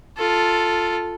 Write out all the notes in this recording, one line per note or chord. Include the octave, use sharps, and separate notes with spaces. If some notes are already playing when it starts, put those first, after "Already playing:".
F4 A4